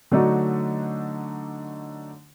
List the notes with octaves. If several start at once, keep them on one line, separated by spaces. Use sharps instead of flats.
D3 F#3 A3 D4 D#4 F#4